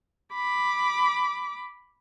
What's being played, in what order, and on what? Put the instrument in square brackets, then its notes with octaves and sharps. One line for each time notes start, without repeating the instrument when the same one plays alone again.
[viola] B5 D6